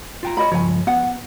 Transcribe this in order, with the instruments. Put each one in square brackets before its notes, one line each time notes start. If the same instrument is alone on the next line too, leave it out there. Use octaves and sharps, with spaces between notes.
[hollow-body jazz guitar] F4 G5 A#5
[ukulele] C#5 D#5 B5
[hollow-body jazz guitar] C#2 G2 F3 [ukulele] C#5 G#5
[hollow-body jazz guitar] B3 [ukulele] F#5